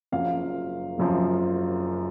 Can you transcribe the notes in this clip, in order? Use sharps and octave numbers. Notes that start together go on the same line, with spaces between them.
F#1 F#2 F3 F5
F#1 F#2 F3